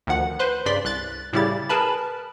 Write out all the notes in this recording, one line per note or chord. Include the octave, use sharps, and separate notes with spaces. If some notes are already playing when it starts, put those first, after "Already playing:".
D2 D#3 F3 F#5
B4 C5 C6 F#6
G2 C#3 D5 C6 B6
C2 F#6 A6
A2 C#3 G3 E4 G4 A6
G#4 A#4 B4 A5 B5